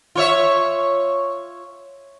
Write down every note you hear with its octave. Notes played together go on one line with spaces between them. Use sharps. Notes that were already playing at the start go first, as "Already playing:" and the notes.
F4 C#5 E5